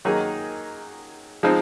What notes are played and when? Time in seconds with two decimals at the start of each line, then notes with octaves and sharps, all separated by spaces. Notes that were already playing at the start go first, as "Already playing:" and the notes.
0.05 D#3 F#3 A#3 D#4 G#4
1.43 F3 G#3 C4 D#4